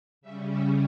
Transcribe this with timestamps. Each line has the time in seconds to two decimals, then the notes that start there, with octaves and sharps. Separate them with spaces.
0.21 C#3 G3 C#4 E5
0.51 E5